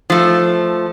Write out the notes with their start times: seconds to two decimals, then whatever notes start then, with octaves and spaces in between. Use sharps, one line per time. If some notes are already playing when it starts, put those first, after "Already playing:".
0.10 F3 A3